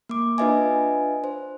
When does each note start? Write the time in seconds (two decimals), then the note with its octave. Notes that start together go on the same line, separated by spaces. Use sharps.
0.09 A#3 D6
0.38 D4 F4 B4 D#5 E5 G#5
1.24 C5